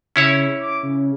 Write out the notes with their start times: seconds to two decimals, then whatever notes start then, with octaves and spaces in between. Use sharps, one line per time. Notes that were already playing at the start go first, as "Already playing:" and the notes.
0.16 C#3 C#4 E4 C#5
0.59 D6
0.83 C#3